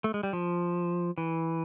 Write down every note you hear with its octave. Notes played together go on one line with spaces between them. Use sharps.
A3
G#3
G3
F3
E3